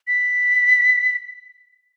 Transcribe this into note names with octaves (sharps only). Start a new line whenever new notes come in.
B6